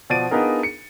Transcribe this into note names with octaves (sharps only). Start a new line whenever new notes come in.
B2 F3 D5 A6 D7 D#7
B3 D4 D#4 F4 G#4 A#4
C#7